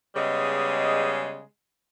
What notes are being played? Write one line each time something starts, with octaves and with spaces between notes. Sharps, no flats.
C#3 G3 G#3 B3 D#5